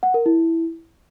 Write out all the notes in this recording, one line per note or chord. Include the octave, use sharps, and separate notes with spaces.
F#5
A#4
E4